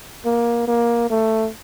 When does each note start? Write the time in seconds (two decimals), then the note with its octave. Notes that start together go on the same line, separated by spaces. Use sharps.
0.25 A#3
0.68 A#3
1.10 A3